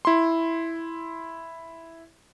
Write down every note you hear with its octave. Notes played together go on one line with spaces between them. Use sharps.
E4 C6